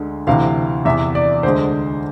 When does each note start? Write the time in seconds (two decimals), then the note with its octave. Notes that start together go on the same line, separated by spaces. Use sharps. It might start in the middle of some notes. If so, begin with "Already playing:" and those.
Already playing: D2 D3 G#3
0.27 D2 C3 E3 F5
0.85 E2 C3 E3 E5
1.15 D5
1.43 D2 D3 G#3 C5